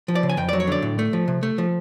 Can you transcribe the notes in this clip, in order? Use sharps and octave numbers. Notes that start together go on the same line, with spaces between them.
F3
D5
C#3
G#5
F2 G5
F#3 D5
C#5
D3 D5
A2
A3
F3
C3
A3
F3